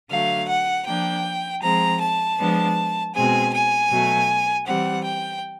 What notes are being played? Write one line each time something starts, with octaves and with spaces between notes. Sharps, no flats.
D3 F#3 A3 F5
F#5
F3 A#3 D4 G5
F3 G#3 C4 A#5
A5
F3 G#3 B3 D4
B2 G#3 C4 G#5
G#5
B2 F#3 A3
E3 G3 C4 F#5
G5